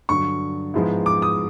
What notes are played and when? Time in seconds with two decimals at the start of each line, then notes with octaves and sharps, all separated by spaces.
0.09 G2 D3 F#3 C#6
0.74 G#2 F3 G#3 B3 E4
1.06 D6
1.22 D#6